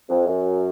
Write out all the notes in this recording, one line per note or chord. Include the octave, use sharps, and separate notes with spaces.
F2
F#2